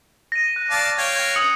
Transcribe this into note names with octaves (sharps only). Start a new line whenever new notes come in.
A#6 D#7
F#6
D5 F5 A5
C#5 F5 G5 G#6
D#6 C#7 F7